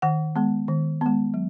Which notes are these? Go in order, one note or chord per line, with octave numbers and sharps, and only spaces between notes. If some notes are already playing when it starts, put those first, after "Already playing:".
D#3 F#5
G#3 B3
D#3
G#3 B3
F#3